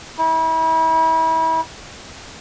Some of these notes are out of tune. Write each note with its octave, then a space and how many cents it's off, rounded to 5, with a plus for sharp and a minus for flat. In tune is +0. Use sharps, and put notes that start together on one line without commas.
E4 -35